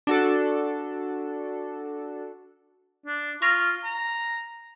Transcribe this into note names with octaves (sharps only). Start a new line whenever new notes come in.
D4 F#4 A4
D4
F4 C#6 A#6 F7
A#5